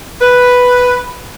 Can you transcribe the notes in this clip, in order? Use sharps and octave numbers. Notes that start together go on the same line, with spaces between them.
B4